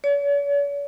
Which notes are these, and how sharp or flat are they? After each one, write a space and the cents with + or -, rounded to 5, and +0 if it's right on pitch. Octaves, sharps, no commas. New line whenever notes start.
C#5 +45